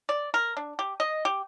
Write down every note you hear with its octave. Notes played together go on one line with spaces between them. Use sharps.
D5
A#4
D4
G4
D#5
G4